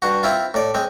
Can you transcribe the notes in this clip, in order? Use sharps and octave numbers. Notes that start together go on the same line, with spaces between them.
G2 F#4
C4 E4 F4
A2 D5
G#3 C4